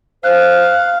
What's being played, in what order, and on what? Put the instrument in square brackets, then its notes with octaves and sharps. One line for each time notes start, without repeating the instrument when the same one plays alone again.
[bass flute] C5 [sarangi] F5 [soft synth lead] F#6